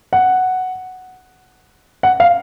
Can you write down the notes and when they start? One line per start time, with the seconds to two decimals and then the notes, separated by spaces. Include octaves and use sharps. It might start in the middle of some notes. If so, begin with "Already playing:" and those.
0.13 F#5
2.03 F#5
2.20 F5